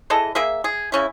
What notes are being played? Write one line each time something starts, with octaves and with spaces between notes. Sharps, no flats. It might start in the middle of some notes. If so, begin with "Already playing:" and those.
E3 G#4 A4 D#5
A#3 G#4 E5
G#4
C#3 C#4 E4